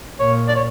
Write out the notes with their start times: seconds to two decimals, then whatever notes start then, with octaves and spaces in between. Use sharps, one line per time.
0.20 A#2 C#5
0.48 D5
0.55 C#5